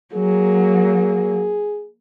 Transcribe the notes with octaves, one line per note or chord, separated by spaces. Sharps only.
F#3 A#3 G#4